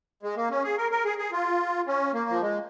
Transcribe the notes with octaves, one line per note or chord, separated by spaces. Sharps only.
G#3
A#3
C#4
G#4
A#4
A#4
G#4
G#4
F4
C#4
A#3
F3
G#3